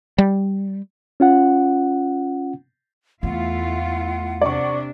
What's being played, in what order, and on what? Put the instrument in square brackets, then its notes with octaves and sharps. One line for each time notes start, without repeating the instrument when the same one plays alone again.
[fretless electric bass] G3
[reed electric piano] C#4 F4 F#5
[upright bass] E2 [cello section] A3 E4 F4 [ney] F#5
[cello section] C3 D4 [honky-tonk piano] D5 C#6